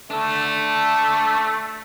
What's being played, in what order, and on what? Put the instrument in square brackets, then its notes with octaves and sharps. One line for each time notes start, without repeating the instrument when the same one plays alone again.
[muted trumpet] A3 [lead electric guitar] D4 A4